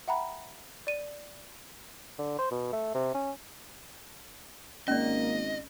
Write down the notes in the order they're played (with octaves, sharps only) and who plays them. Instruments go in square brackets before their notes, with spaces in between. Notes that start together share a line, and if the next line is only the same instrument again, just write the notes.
[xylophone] E5 F#5 G5 A#5 B5
D5 D#7
[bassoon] D3
C5
B2
A3
C3
C#4
[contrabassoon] G#1 [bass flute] A#3 [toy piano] C#4 D5 [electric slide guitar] D#5